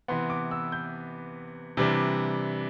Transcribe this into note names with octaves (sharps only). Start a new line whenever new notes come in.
C3 E3 B3 C6
D6
E6
G6
C3 E3 G3 D4